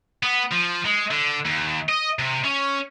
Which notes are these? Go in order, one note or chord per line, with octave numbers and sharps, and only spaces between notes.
B3
F3
G#3
D3
D#2
D#5
C3
C#4